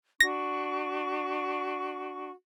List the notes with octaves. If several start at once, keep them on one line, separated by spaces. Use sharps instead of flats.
D4 F#4 C#6 A#6